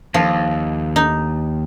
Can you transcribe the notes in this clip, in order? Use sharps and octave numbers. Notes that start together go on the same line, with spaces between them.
D#2 F3
D#4